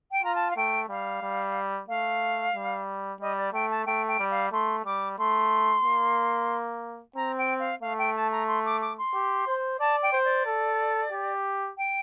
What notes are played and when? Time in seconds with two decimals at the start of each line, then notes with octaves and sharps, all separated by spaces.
0.11 G5
0.23 F4 A#5
0.35 A5
0.50 F5
0.56 A3 G5
0.89 G3 F5
1.22 G3
1.88 A3 F5
2.54 G3
3.20 G3 D#5
3.37 D5
3.53 A3 G5
3.70 A5
3.86 A3 G5
4.08 G5
4.19 G3
4.30 F5
4.52 A3 C6
4.85 G3 D6
5.18 A3 C6
5.84 A#3
7.16 C4 A#5
7.38 G5
7.59 F5
7.81 A3 F5
7.98 G5
8.15 A5
8.31 A#5
8.47 C6
8.65 D6
8.81 D6
8.98 C6
9.14 G4
9.46 C5
9.79 D5 A5
10.02 G5
10.12 C5
10.24 D5
10.46 A4
11.12 G4
11.77 G5